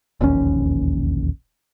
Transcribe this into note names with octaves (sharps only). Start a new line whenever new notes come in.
E1 A#1 D#2 C#4